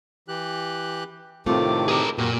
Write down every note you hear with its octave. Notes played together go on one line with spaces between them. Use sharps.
E3 G4 F#6
A2 C3 D#3 A3 C4 F4 D6
G4 G#4 A#4 B4
F#2 A#2 A#3 F#4 G4